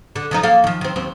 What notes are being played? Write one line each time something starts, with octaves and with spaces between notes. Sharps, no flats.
D3
D#3 F3 D#4
A#3 A4 F5
D#3 F3
D#3 C4
D#2 C4